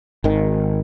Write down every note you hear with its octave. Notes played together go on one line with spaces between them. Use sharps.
G#1 D#3